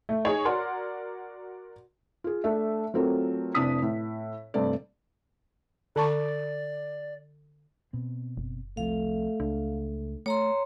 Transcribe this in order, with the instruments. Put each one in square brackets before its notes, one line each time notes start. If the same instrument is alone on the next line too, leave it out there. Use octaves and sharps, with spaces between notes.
[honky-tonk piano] A3
D#4 G#4 C#5
F#4 A#4 D5 F#5 C6
[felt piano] F4 G#4
A3 D4 E5
F#3 A3 C4 F4 A4 A#4
F1 C3 D4 E4 D#6 B6
A2
G2 C3 A3 D5
[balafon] D3 A5 C#6 [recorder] D5
[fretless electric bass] B2 C4
[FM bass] F#1
[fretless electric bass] C2 C3 F3 [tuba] A3 [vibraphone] F5
[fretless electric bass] C#2 [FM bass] D4
[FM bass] A3 [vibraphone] C#5 A#5 C6